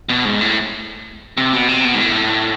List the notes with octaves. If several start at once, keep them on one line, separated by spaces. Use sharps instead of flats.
B2
G#2
A2
C3
B2
C3
B2
G#2
A2